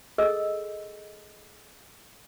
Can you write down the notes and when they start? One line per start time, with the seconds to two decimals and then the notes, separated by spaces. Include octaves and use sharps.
0.18 G#4 A4 D#5 E6